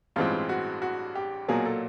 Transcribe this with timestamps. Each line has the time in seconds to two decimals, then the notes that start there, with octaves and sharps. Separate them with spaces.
0.16 A1 G2 E3 G#3 C4 F4
0.49 F#4
0.82 F#4
1.15 G4
1.48 B1 A#2 F#3 A#3 G#4
1.65 A4